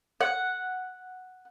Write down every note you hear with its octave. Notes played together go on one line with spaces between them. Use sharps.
F#5